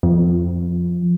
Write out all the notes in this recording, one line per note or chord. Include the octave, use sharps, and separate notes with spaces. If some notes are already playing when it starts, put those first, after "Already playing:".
F2